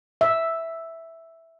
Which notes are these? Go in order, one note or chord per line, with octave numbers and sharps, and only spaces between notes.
E5